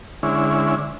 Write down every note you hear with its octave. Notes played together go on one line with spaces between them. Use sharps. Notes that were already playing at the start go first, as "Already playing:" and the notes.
D3 G#3 C#4 E4